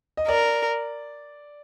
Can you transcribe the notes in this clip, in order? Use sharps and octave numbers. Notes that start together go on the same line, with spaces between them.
D#5
A#4 D5